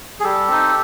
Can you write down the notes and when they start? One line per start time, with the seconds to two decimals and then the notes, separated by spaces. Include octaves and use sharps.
0.20 G#4
0.24 G3 G4 A4
0.48 C4 D#4